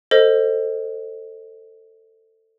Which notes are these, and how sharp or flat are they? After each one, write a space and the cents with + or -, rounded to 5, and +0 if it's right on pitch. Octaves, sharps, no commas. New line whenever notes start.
A4 +20 C5 +0 D#5 +0